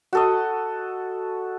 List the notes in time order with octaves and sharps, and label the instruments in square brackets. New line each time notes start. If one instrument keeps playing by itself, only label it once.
[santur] F#4 A4 D#5